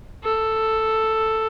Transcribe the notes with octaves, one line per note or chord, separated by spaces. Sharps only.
A4